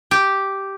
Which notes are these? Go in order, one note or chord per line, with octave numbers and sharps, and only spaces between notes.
G4